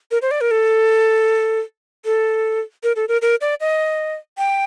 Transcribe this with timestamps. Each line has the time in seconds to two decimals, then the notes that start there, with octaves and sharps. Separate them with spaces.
0.11 A#4
0.22 C5
0.31 D5
0.41 A#4
0.51 A4
2.05 A4
2.83 A#4
2.96 A4
3.09 A#4
3.22 A#4
3.41 D5
3.60 D#5
4.38 G5